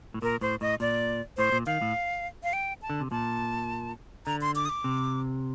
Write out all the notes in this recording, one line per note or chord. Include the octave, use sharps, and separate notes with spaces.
A2
A#2 A#4
A2 C5
A2 D#5
A#2 D5
A2 C5
A#2
D#3 F5
A2
F5
G5
A5
D3
C3
A#2 A5
D3 A#5
C6
D6
D#6
D6
C3